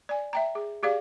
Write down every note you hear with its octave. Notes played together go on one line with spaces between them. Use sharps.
D5 G#5
E5 G5 A#5
G#4
G4 G#4 D5 F5